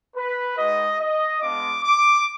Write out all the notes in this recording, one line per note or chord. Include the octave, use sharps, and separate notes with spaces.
B4
G#3 D#4 F#4 D#5
D#5
G#3 B3 D4 F4 D6
D6